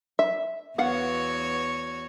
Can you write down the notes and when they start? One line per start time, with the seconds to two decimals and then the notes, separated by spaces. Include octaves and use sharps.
0.19 E5
0.78 E2 B3 F#4 C#5 F5 F#5